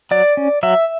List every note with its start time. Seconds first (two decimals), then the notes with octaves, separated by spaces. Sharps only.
0.11 F#3 D5
0.37 C#4
0.63 F#3 E5